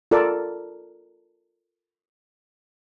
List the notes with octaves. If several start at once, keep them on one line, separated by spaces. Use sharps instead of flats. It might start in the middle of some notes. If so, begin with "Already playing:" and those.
F4 A4 A#4 D5